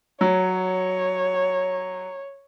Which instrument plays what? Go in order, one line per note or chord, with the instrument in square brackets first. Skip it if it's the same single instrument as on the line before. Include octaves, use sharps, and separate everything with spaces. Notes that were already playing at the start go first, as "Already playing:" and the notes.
[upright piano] F#3 [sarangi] C#5